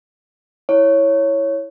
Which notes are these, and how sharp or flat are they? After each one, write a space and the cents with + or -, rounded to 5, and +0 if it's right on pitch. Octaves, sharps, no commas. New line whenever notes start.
E4 +0 C#5 +0